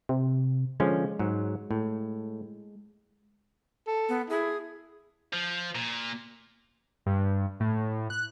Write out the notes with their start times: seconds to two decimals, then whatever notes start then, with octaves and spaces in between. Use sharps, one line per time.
0.09 C3
0.80 D3 F3 G#3 C#4
1.19 G#2 F#3
1.71 A2
3.87 A4
4.09 B3
4.30 E4 G#4
5.33 F3
5.75 A#2
7.06 G2
7.60 A2
8.10 F#6